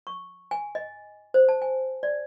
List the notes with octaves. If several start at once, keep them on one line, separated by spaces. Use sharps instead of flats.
C#6
G#5
D#5
C5
A5
G#5
D5